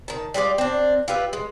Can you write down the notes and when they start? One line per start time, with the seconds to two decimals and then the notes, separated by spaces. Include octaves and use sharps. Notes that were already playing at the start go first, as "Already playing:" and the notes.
0.08 D#3 A5
0.34 G3 G#3 F4 D5
0.58 C4 D4
1.08 F4 G4 B4 E5
1.33 G#3